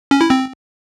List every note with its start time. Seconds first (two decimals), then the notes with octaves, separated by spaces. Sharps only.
0.11 C#4
0.21 E4
0.30 C4